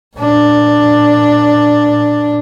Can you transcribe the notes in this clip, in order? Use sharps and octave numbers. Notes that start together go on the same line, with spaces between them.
A#2 D4